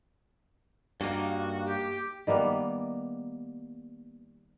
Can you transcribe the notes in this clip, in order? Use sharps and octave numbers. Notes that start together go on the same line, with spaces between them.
G2 A#3 D#4 F#4
G4
D#3 G3 A#3 B3